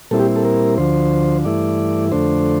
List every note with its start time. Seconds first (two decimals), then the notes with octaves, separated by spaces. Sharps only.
0.11 A#2 G3 C4 E4 A4
0.20 G4
0.36 A4
0.45 A#4
0.78 D2 D3 F3 C5
1.45 G2 E3 A3 E4 D5
2.12 F2 D3 A3 D4 C5